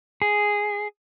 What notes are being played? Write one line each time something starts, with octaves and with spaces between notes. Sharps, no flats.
G#4